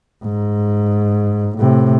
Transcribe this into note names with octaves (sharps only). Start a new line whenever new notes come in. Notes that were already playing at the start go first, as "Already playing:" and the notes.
G#2
A2 C3